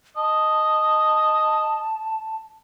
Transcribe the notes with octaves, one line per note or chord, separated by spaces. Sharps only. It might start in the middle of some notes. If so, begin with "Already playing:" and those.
D#5 A5